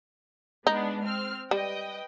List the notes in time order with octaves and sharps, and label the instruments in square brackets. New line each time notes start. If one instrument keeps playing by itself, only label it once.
[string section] G#3 B3 D4 [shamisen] D#4
[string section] C4 F6
[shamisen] G3 [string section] B4 D#5 G5